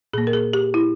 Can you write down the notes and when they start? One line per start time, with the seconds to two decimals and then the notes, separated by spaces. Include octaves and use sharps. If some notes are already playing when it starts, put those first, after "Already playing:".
0.13 A#2 A#3 G#4
0.27 A#4
0.33 G#4
0.53 G4
0.74 E4